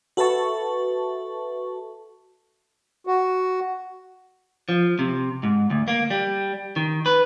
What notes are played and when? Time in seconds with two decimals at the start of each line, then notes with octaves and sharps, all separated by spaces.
0.17 F#4 A4 B4 E5 A5 C#6
3.07 F#4
4.69 F3
4.99 C3
5.43 G#2
5.70 D2
5.88 A#3
6.10 G3
6.76 D#3
7.06 B4